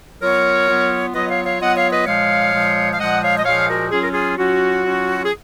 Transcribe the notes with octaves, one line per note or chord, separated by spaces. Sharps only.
F#3 B3 F4 A#4 C#5
F#3 B3 F4
F#3 B3 F4 B4 D#5
C#5 F5
C#5 F5
F#3 B3 F4 D#5 F#5
C#5 F5
B4 D#5
A#2 F3 G#3 C#5 F5
A#2 F3 G#3
F5
A#2 F3 G#3 D#5 F#5
C#5 F5
D#5
A#2 F3 G#3 C#5 F5
F#4 A#4
F#3 C#4 F4 G#4
A#4
F4 G#4
F#3 C#4 F4 F#4
F#3 C#4 F4
G#4